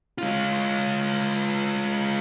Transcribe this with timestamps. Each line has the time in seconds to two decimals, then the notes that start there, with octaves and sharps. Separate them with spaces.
0.18 G#3 F4